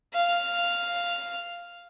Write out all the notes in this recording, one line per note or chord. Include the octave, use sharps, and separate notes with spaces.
F5